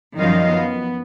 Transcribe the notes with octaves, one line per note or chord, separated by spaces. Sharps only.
F#2 D#3 F3 G3 D#5 F5
B3